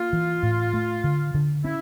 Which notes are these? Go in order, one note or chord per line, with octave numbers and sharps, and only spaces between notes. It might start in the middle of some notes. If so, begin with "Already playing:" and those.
Already playing: A#3 F4
E3
A2
A3
D3
D3
C#4 E4